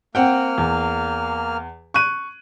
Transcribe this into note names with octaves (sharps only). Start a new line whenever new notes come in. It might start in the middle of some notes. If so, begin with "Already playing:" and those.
A#3 C4 F#5 G5 F6
E2
C#6 F#6 D#7